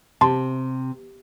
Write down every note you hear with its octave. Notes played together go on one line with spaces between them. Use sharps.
C3 A5 C6